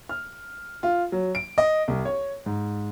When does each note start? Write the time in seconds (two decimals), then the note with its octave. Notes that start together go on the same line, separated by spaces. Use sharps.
0.09 F6
0.83 F4
1.12 F#3
1.35 D7
1.58 D#5
1.88 C2
2.05 C#5
2.46 G#2